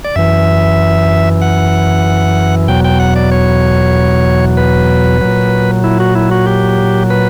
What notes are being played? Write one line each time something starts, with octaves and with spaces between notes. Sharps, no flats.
D5
F#2 E3 E5
F#5
E2 B2 F#3 G5
G5
F#5
D5
C#5
B4
A#2 F#3
E4
F#4
E4
F#4
G4
B4